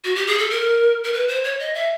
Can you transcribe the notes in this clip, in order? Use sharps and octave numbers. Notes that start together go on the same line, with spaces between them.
F#4
G4
G#4
A4
A#4
A#4
B4
C5
C#5
D#5
E5